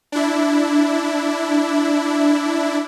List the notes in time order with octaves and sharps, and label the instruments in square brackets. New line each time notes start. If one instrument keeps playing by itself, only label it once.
[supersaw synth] D4 E4